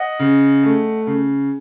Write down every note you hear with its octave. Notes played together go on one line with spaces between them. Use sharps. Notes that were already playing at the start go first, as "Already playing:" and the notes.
Already playing: D#5 F#5
C#3
A3
C#3